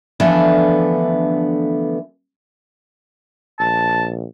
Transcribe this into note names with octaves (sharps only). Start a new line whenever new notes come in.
D3 E3 F3 A3 B3 D4
A#1 A5